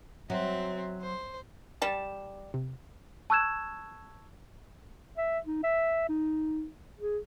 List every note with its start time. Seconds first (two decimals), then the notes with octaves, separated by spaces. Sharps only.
0.30 F#3 C4 E5
1.01 C5
1.82 G3 A5
2.54 C3
3.30 A5 C#6 E6 F#6 G#6 E7
5.18 E5
5.46 D#4
5.63 E5
6.09 D#4
6.99 G#4